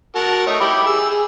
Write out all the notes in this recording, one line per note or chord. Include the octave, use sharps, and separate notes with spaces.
F#4 A#4 A5
A3 D#4 C#5
E4 G4 B5
G#4 E6
G#4